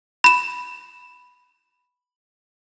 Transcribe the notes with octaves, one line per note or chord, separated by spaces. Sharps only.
B5 E7